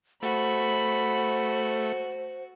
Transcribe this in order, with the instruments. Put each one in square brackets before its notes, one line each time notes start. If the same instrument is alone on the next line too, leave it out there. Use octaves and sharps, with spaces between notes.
[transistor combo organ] A3 [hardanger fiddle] F#4 [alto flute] C5 [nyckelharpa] B5